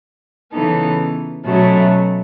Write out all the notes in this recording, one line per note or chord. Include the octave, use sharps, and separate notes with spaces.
C#3 E3 B3 D#4 A4
B2 F#3 A3 C#4